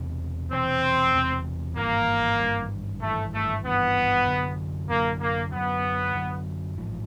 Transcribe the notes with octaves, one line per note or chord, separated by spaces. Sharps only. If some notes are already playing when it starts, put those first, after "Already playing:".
Already playing: E1 E2 C3
E1 E2 C3 C4
E1 E2 C3
G#1 G2 E3 A#3
G#1 G2 E3
G#1 G2 E3 A3
A3
G#1 G2 E3 B3
F#2 D3 F#3
F#2 D3 F#3 A#3
A#3
F#2 D3 F#3 B3
F#2 D3 F#3
A1 G#2 F3